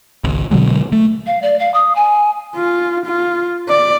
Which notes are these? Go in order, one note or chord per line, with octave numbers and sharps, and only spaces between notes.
G#1 C#2
B2 D3 F#3 G#3
A3
F5
D5
F5
D#6
G#5
F4
F4
D5